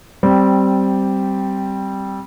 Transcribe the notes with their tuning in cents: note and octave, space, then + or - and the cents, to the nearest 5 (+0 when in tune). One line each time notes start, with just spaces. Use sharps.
G3 -10 C4 +0